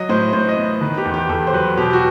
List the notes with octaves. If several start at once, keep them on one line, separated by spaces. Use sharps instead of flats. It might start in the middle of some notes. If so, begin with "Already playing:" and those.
Already playing: F#3 D#5
A2 C5
A2 C5
D#5
B3
D#3 B4
G4
E2
G4
E2 A4
C5
F#3 B4
B2 G4
F#4